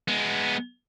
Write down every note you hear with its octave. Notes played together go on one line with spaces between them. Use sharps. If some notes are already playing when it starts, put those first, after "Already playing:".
G#3 B3